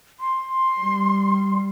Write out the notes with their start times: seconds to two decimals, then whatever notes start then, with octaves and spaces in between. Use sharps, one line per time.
0.20 C6
0.79 G3